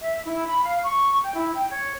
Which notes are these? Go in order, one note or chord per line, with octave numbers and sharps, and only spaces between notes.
E5
E4
B5
F5
C#6
G5
E4
G5
C#5